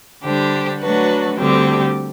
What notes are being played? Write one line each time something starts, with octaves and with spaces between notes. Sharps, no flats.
D3 G3 D4 G4 C5
F#3 A3 D4 F#4 B4
D2 D3 G3 C4 G4